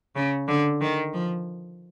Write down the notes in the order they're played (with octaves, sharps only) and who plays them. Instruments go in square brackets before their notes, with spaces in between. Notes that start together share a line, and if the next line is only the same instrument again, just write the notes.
[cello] C#3
D3
D#3
F3